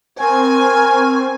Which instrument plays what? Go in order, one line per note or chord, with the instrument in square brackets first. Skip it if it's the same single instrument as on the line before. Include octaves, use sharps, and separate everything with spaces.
[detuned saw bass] C4 [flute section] A#4 C#6 F6 [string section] G#5